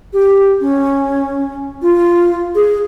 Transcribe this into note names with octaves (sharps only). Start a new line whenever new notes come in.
G4
C#4
F4
G#4